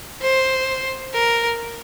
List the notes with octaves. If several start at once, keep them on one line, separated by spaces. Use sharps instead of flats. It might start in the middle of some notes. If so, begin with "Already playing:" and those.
C5
A#4